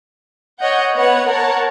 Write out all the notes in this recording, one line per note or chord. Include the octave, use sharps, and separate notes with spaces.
C#5 D#5 F#5 G6
B3 C#5 F#5
A#4 C#5 F#5 A5